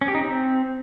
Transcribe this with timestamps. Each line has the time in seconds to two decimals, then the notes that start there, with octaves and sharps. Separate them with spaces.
0.01 C#4
0.08 G4
0.15 D#4
0.21 C4